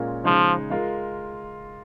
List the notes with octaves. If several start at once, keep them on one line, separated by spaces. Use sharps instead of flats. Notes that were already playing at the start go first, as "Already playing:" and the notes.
Already playing: A#2 G#3 C#4 F4 A#4
C#3 F3 G#3 D#4
G#3 F4 A#4